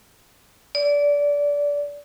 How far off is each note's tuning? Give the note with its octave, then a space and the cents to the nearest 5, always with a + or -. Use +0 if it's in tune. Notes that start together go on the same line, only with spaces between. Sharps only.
D5 -20